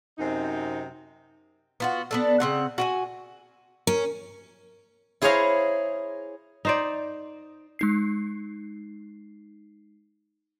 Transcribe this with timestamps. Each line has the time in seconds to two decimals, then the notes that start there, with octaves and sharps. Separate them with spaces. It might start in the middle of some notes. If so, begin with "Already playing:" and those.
0.18 F#2 C3 C4 D#4
1.80 B3 F4 F#4
2.11 B3 D4 A4
2.40 C#3 C4 F#5
2.78 F#4 G5 G#5
3.87 C#4 A#4
5.22 E4 G#4 C5 C#5 F5 A#5
6.65 D#4 C5 D5
7.79 G#3 D#4 C7